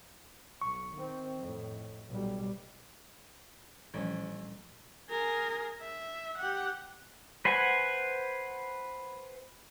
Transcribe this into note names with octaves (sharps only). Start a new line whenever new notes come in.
B1 C#6
D#3 C4
F2 A2
B1 B2 G3
A1 A#2 F3 G3 C#4 D4 C5
G#4 A#4
E5
G4 F#5
B4 C5 F#5 G#5